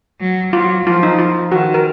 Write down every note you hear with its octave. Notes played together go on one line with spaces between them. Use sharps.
F#3
F#3 F4
F3 F4
D#4
F4
D#3 F#4
A#4